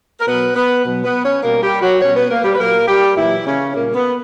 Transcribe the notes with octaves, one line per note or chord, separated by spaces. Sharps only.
A#4
B2 F#3 B3 B4
B3 B4
B2 F#3
B3 B4
C#4 C#5
B2 G3 A#3 A#4
G3 G4
F#3 F#4
B2 G3 C#4 C#5
B3 B4
A#3 A#4
G3 G4
B4
A#2 F#3 A#3 A#4
G3 G4
A#2 E3 F#3 E4
C#3 C#4
A#2 G3 A#3
B3